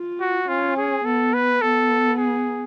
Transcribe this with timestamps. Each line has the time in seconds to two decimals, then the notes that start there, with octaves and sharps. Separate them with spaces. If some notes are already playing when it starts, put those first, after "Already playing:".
Already playing: F4
0.20 F#4
0.48 C#4 F4
0.77 G#4
1.05 B3 A4
1.34 B4
1.61 B3 A4
2.18 G#4